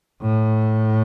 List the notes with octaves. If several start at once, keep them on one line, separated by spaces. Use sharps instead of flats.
A2